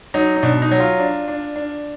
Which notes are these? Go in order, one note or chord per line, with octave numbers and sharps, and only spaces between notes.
F#3 D#4
D#4
B2 D4
D#4
F#3
F4
D4
D4
D4